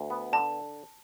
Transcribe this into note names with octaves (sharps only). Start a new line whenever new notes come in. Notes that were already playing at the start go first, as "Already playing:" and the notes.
Already playing: D2
B3
D3 A5